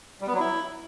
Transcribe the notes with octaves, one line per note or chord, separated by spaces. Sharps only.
G3
B3
F#3
E4